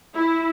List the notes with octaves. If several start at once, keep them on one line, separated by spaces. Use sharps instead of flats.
E4